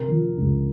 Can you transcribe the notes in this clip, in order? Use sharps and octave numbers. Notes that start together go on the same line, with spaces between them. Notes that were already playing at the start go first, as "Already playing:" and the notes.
Already playing: C3 A#4
F3
C#2